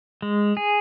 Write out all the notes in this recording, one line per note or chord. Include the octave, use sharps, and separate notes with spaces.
G#3
G#4